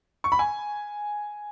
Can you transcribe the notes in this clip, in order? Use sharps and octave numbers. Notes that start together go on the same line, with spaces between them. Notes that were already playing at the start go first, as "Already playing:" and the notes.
C#6
B5
G#5